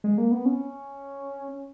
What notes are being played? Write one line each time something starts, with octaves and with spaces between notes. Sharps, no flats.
G#3
A#3
B3
C#4